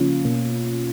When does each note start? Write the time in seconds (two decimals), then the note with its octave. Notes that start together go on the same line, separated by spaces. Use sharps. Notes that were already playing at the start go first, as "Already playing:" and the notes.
Already playing: C#3 F3 A#3 C#4 F4
0.25 B2 A#3